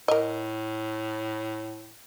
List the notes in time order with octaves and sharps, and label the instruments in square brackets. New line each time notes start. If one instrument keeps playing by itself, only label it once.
[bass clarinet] A2 [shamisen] A#4 D#5